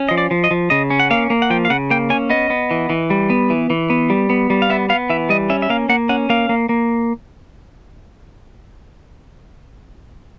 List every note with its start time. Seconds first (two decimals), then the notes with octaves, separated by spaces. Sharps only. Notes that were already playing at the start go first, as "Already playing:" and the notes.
Already playing: C#4
0.09 F3 D#5
0.18 D5
0.31 F3
0.44 D#5
0.51 F3
0.70 C#3 D#5
0.90 C#4
1.00 F#5
1.11 A#3 F5
1.30 A#3
1.42 F#5
1.50 F3 G5
1.65 F5
1.70 C#3 F#5
1.90 A#3 G5
2.10 C#4 G#5
2.30 B3 D#5
2.50 B3
2.71 E3
2.90 E3
3.10 G3
3.30 B3
3.50 E3
3.70 E3
3.90 B3
4.10 G3
4.30 B3
4.50 G3
4.62 F5
4.70 B3 E5
4.89 B3 F5
5.10 E3 E5
5.29 G3 D#5
5.50 C#4 E5
5.62 E5
5.70 A#3 F5
5.89 A#3 F#5
6.09 C#4 F#5
6.30 A#3 F5
6.49 A#3
6.69 A#3